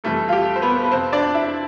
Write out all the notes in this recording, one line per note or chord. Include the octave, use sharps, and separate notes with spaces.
F2 C3 E3 G3 A3 A4
F4
G4
C5
B3 B4
B4
F2 C3 F3 C4 C5
D4 D5
E4 E5